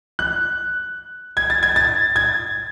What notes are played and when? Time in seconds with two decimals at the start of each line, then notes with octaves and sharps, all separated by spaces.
0.19 F#6
1.37 G#6
1.50 A6
1.63 G#6
1.76 A6
2.16 G#6